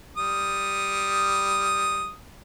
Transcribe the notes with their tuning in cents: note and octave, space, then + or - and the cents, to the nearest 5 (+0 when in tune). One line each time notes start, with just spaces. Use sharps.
G3 +0 D#6 +0